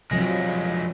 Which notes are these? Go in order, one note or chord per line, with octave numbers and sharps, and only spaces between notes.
F2 C3 F3 F#3 G#3